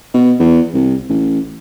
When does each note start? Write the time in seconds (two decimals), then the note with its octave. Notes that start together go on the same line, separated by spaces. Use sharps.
0.14 B2
0.40 E2
0.74 C2
1.09 A1